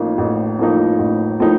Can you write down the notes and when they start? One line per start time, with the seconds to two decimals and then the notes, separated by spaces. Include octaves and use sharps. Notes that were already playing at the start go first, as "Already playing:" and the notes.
Already playing: A1 A2 F3 A#3 D#4
0.18 A1
0.59 A2 F3 A#3 D#4
0.99 A1
1.40 A2 F3 A#3 D#4